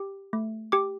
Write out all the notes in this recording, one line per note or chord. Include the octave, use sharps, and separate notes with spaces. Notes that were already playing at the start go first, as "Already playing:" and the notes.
Already playing: G4
A3
G4 D6